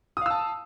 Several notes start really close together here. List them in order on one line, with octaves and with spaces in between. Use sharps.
D#6 F5 E6 A5